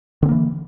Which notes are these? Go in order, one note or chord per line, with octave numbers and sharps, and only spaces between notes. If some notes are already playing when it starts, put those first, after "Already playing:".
D3 E3 A#3 C4